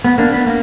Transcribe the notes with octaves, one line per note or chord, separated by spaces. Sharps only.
B3
A#3 D4
B3
A#3